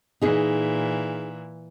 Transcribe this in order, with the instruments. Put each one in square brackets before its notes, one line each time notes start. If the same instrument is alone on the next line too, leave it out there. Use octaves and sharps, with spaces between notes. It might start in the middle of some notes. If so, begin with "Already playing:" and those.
[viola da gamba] A#2 E3 [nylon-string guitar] D#4 G#4 D#5